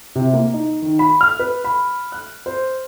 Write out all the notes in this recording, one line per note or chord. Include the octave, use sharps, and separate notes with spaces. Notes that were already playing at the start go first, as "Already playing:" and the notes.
C3
A#3
D#4
D#3
B5
F6
B4
B5
F#6
C5